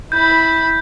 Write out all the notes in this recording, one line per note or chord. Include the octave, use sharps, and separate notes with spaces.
E4 B5 G6